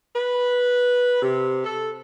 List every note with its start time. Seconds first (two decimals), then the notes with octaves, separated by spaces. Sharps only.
0.16 B4
1.22 C3
1.64 A4